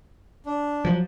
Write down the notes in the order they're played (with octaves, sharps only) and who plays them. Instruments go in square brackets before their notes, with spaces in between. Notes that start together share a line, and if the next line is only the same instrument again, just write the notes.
[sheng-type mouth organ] D4
[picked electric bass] F3 F#3